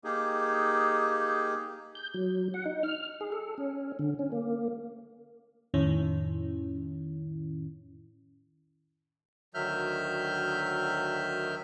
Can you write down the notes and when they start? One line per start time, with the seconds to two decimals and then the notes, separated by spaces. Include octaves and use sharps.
0.04 A#3 D#4 G4 G#4
1.95 G6
2.14 F#3
2.54 F#5
2.65 D#4
2.83 F6
3.21 G#4
3.32 A4
3.58 C#4
3.99 D3
4.19 C#4
4.32 A#3
5.74 F2 A2 D#3 C#4 E4
9.54 D2 D#3 F#3 E5 F6 G6